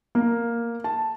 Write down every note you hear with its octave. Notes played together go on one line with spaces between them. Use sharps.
A#3
A5